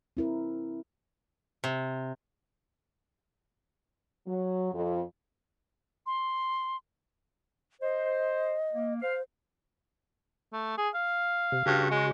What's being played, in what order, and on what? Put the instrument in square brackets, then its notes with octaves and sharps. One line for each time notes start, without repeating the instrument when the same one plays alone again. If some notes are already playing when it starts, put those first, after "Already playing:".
[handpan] C4 E4 A#4
[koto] C3
[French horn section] F#3
F2
[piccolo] C6
[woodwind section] C5 [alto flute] D#5
[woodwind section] A#3
[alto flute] C5 [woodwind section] F5
[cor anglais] A3
G#4
F5
[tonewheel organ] C3
[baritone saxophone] G2 [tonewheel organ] C#3 F#4
[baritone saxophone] G#3